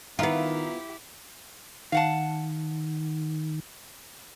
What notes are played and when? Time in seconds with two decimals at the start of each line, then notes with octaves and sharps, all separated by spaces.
0.19 D#3 B3 E4 F4 G4 E5 F5 A#5
1.92 D#3 F5 F#5 A5